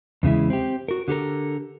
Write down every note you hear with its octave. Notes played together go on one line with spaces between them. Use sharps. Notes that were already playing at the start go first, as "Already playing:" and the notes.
E2 C#3 G#3 E4
C4 G4
F#4 A#4
D3 G4 A4 A#4